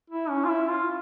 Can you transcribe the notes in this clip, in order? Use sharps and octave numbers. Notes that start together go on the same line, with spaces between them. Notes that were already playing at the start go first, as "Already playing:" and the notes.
E4
C#4
F4
E4
F4